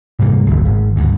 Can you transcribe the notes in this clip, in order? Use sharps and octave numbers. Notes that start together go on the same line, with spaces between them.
G#2 C3 G3 A#3
F#1 D2
G#1
D2 G2